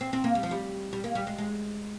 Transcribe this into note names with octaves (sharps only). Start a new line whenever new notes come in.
C4
C4
A#3
G3
F3
G3
G3
A#3
G3
G#3
G#3